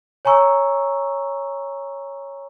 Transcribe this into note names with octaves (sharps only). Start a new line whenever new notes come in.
C#5 G#5 A#5 C#6 E6